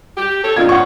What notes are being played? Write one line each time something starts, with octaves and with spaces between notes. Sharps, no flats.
G4
A4 C#5
D#3 A#3 D4 F4 G#6
F3 C#4 F#5 C#6